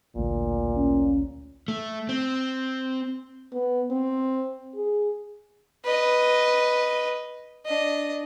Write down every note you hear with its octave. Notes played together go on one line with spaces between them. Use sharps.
A1 D2 A#2
C#4
A3
C4
B3
C4
G#4
B4 D#5
D4 D#5